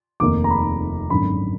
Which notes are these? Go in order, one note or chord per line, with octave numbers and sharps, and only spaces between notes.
F1 D#2 D#3 A#3 D6
A#5
B5
G#1 F#2 D3 B5